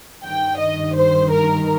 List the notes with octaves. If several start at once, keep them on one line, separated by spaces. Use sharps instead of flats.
G2 D#3 G5
D#5
C5
A#4